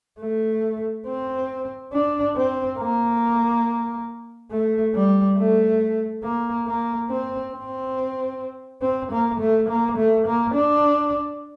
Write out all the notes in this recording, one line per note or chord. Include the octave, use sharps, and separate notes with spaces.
A3
C4
D4
C4
A#3
A3
G3
A3
A#3
A#3
C4
C4
C4
A#3
A3
A#3
A3
A#3
D4